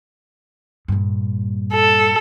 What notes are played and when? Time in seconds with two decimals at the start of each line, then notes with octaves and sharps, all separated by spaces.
0.88 G2 A#2
1.73 A4